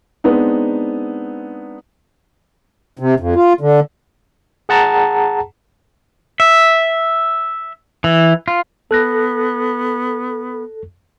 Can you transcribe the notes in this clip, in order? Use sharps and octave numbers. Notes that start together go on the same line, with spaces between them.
G#3 B3 C4 D4 D#4
C3
F2
F4
D3
G#4 F#5 A5 A#5
E5
E3
F4
B3 A4 F#6 A#6